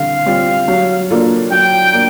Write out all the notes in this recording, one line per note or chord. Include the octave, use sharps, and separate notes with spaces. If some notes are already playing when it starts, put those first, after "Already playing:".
Already playing: D3 G3 C4 F5
G3 C4 F4
F#3
A#3 D4 F4 A4
F#3 G5
A#3 D4